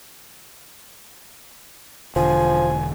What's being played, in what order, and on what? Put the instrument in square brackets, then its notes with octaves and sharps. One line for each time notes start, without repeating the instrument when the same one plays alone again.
[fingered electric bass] E1 D3 [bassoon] F3 [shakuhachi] G#5